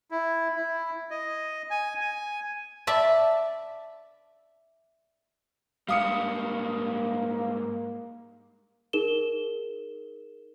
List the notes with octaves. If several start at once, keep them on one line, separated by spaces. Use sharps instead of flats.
E4
E4
D#5
G#5
G#5
D5 E5 A5
G#2 G3 A#3 F5 D#6 C#7
D#4 G#4 A#4 E7 G7